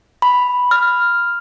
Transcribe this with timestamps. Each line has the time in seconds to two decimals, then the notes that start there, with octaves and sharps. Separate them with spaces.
0.22 B5
0.71 F6